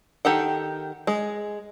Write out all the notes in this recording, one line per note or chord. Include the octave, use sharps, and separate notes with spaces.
D#3 G4 A4 F#5
G#3